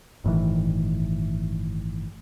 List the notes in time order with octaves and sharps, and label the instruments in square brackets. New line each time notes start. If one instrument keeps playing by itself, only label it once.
[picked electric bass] G1 A2 D#3 E3